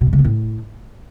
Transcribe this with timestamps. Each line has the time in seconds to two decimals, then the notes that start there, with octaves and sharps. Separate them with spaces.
0.01 B2
0.07 G2
0.13 C#3
0.19 B3
0.24 A2